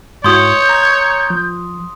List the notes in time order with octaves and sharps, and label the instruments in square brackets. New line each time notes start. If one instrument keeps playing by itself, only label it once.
[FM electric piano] G#2 E4 F#4 [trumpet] C#5 [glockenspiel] C6 D#6 [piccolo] G6
[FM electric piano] A#5
F3